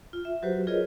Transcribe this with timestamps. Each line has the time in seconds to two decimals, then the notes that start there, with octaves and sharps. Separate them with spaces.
0.13 F4
0.25 E5
0.43 F#3 F#4 G4 B4 C5
0.67 F4 G#4 A#4 B4 C#5 D#5